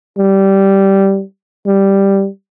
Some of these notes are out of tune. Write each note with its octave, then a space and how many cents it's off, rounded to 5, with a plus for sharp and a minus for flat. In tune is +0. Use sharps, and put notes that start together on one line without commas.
G3 -10
G3 +0